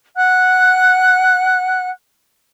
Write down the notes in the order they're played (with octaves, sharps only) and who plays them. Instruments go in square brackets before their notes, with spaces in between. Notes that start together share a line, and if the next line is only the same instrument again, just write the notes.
[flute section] F#5 F#6